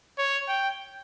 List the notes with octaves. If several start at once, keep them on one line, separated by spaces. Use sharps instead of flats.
C#5
G5